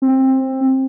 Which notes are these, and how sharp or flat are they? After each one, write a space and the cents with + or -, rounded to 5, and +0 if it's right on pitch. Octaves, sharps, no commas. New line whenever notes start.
C4 +20